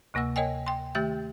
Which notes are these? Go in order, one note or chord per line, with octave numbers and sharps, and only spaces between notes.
D2 C3 A#3 F#5 E6
A#4 C#5 D#5 G5 G#5
G5 C6
D#3 A3 G4 E5 G6